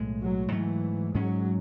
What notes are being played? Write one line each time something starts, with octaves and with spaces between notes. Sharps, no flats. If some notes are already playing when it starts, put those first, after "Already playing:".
Already playing: B1 A2 G#3
F#3
G#2 E3 F#3 A3
G#2 F#3 G#3 C#4